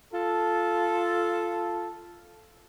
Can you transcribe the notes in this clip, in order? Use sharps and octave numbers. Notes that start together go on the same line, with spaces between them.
F4 A4